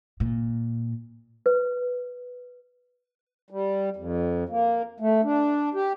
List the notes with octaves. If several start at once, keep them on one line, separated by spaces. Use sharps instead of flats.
A#2
B4
G3
F2
A#3
A3
D4
G4